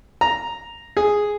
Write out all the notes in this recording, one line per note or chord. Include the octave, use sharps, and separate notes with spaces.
A#5
G#4